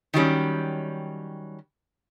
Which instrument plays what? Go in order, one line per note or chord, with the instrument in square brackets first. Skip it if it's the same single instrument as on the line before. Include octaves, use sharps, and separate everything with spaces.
[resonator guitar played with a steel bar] D#3 F#3 G3 C#4